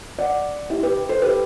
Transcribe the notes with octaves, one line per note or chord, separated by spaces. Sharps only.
D5 F#5
E4 G4
G4 B4
A4 C5
G4 B4